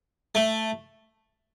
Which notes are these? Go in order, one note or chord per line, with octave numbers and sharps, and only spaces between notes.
A3